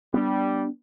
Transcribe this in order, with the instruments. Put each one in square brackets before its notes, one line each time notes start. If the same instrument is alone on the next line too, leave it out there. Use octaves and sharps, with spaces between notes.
[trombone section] G3 [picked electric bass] B3 C4 D4